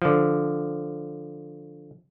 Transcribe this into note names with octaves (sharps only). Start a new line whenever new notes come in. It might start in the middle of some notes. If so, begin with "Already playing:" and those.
D3 F3